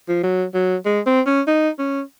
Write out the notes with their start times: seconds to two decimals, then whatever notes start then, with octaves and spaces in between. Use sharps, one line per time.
0.09 F3
0.23 F#3
0.54 F#3
0.86 G#3
1.06 C4
1.26 C#4
1.47 D#4
1.79 C#4